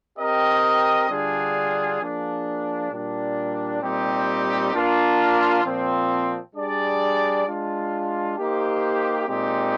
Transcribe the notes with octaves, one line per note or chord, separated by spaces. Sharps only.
C4 G4 A#4 D#5
D3 G3 D4 F4 G#4
F3 A#3 D4 G#4
A#2 G3 D4
A#2 G3 C4 D#4 G4
A#3 D4 F4 A#4
A#2 F3 C4
G3 D4 G#4 D5
G#3 D4 F4
A#3 D#4 G4 C5
A#2 G#3 C4 D#4 G4